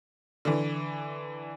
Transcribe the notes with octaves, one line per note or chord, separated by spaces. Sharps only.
D3 E3